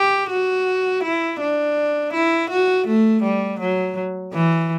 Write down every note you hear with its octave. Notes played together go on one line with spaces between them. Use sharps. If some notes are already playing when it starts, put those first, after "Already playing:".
Already playing: G4
F#4
E4
D4
E4
F#4
A3
G3
F#3
E3